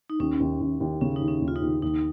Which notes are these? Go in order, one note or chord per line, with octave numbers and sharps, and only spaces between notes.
D#4
D#2 C#4
D#2
D#2
D#2
C#3 C#4
D#2 D#4
C#4
D#2
F4
D#4
D#2
D#2 D#4